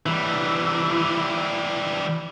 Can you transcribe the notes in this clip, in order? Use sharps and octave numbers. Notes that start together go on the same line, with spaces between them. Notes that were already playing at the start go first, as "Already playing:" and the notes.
E3 G3